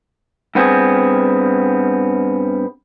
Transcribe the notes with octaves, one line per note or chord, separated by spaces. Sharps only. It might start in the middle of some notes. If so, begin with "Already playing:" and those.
G2 B3 C4 G#4